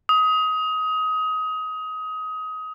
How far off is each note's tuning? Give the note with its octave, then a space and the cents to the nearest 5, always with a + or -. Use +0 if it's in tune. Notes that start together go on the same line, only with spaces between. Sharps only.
D#6 +20